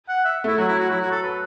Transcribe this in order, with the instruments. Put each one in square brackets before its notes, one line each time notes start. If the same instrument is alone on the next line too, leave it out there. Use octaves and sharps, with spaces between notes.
[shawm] F#5
E5
[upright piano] A3 [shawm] E4
[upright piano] F#3 [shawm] F#4
[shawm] E4
F#4
[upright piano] F#3 [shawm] E4
[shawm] F#4
A4
B4